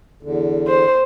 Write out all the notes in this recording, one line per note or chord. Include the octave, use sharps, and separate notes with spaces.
E2 D3
C5